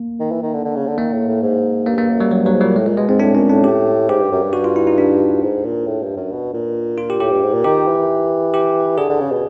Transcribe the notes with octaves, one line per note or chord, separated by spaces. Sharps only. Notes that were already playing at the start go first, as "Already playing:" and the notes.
Already playing: A#3
D#3
E3
D#3
D3
D3
C#3
D3
D#3 A#3
A2
A2
G#2
G2 A#3
A#3
F#2
G3
F#2 F#3
G2 F#3
G#2
A#2 G3
A2 G#3
A#2 G#3
B2 G#3
G#2 C4
A2 D4
A#2 C#4
A2 D4
G4
G#2 G4
G2
F#2
G2
F#4
F4
E4
D#4
D4
G#2
A#2
A2
G2
F#2
B2
A#2
F4
G4
A2 G4
G2
G#2
A#2
D#3 G4
E3
G4
D3 G#4
D3
C#3
B2